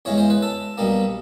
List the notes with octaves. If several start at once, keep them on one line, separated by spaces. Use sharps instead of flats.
E2 C#3 E3 G#3 C#5
C5
B4
A4
B1 B2 G3 A#3